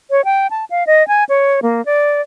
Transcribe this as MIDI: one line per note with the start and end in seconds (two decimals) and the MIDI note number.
0.11 0.24 73
0.25 0.47 79
0.51 0.65 81
0.70 0.86 77
0.87 1.06 75
1.08 1.24 80
1.29 1.60 73
1.63 1.84 58
1.86 2.21 74